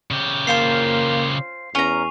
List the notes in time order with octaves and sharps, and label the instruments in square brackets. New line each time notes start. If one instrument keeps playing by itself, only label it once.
[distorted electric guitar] C#3 G4
[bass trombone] A#3 [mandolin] C#4 F4 C5 [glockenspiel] C7
[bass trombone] E2 [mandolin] C#4 A#5 [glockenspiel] G#5 C#6 F7